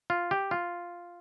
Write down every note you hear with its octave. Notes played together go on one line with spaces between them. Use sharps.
F4
G4
F4